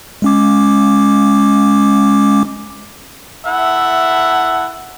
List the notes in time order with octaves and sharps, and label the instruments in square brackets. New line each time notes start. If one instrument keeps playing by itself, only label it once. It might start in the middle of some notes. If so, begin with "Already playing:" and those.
[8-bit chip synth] G#3 C#4 D6
[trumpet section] E4 A4 E5 F#5